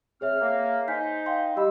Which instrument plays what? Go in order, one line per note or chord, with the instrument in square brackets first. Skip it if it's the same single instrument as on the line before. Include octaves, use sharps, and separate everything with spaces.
[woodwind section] C4 F6 [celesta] G#4 C#5 E5
[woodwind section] A#3
[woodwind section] D#4 C5 [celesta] G#5 G6 B6
[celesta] F5 G5 C6
[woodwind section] G3 E6 [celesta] G4 D#5 B5